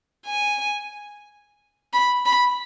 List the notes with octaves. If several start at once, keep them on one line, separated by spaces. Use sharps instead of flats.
G#5
B5
B5